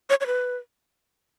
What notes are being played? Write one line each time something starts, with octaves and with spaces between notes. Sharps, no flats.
C#5
C#5
B4